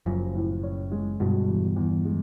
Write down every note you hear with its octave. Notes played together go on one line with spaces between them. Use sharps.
F#1 F#2 F3
A2
C#4
G#3
G1 G2 B2
E2
E2
G#3